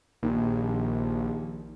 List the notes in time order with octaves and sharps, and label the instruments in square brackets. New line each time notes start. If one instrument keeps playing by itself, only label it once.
[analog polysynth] A#1 [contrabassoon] D#2